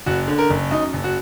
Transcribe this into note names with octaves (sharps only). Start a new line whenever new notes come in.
F#1 F#4
D3
A#4
F#1
F#2 D#4
F#1
F#4